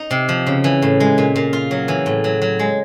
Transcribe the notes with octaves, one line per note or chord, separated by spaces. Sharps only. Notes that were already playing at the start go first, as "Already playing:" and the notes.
Already playing: D#4
C3
F3
C#3
E3
A2
G#3
A#2
A#2
F4
F#3
E3
A2
F#3
F#3
G#3